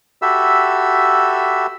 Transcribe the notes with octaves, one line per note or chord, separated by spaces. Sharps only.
F#4 G4 A4 E5 B5 E6